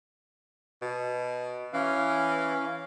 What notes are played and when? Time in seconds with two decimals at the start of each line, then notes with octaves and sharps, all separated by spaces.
0.82 B2
1.73 E3 C#4 F5